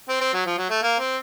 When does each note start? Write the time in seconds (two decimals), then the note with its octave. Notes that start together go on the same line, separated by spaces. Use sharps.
0.09 C4
0.21 C4
0.34 F#3
0.46 F3
0.58 F#3
0.70 A3
0.82 A#3
0.99 C4